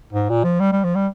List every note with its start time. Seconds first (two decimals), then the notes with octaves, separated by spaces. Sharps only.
0.13 G#2
0.29 A#2
0.44 F3
0.60 G3
0.72 G3
0.84 F3
0.95 G3